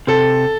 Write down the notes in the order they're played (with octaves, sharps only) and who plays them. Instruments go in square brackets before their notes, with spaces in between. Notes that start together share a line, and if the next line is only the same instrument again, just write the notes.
[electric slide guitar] C3 [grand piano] A4